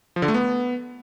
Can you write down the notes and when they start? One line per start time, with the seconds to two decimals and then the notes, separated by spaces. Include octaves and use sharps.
0.16 F3
0.22 D3
0.28 A3
0.34 B3